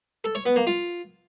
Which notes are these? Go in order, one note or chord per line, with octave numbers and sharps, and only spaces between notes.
A4
C#5
B3
A#3
F4